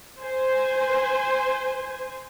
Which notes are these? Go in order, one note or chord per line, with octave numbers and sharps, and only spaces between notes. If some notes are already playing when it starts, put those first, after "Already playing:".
C5 G#5